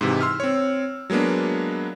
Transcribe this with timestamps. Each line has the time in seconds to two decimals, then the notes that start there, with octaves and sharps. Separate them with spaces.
0.01 G#2 C3 E3
0.21 C6 E6 F6
0.40 C4 C#5
1.10 F#3 G#3 A#3 B3 D4